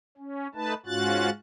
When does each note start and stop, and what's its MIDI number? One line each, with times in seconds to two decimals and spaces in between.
0.18 0.47 61
0.55 0.74 57
0.55 0.74 63
0.55 0.74 71
0.55 0.74 81
0.86 1.30 44
0.86 1.30 61
0.86 1.30 65
0.86 1.30 66
0.86 1.30 90
0.86 1.30 93